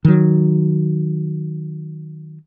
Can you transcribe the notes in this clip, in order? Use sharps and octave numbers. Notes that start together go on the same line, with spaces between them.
D#3 F#3